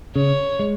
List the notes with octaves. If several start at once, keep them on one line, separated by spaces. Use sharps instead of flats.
C#3 C#5
G#3